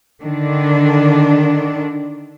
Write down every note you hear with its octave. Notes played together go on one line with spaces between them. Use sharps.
D3 D#3 D4